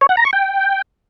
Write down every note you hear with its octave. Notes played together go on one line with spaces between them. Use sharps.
C#5
F#5
A#5
C#6
G5